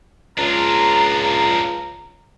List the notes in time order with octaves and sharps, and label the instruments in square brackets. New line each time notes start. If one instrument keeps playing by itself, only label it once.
[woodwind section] C#2 A#5 [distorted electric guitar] D4 F4